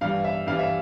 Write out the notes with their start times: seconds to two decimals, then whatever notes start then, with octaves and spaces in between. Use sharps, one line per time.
0.01 G2 E3 G3 F5
0.24 E5
0.47 G2 E3 G3 F5
0.59 E5